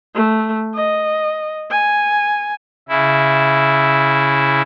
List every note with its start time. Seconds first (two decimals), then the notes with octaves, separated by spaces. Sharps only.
0.15 A3
0.75 D#5
1.71 G#5
2.89 C#3 E4